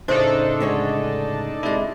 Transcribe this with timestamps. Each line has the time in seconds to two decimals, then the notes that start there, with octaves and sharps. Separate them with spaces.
0.08 A2 C#3 A3 D4 D#4 A4 C5 D#5
0.60 D3 G#3 C#5
1.63 C3 G#3 E4 D5